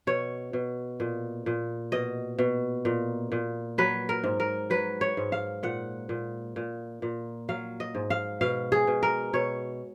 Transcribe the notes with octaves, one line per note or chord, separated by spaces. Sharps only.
B2 C#5
B2
A#2
A#2
B2 D#5
B2
A#2
A#2
F#3 B4
A#4
G#2
A#4
F#3 B4
C#5
G#2
F5
A#2 F#5
A#2
A#2
A#2
F#3 F5
D#5
G#2
F5
B2 F5
G#4
B2
A#4
B2 C#5